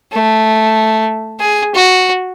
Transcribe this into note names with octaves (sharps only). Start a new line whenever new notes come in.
A3
G#4
F#4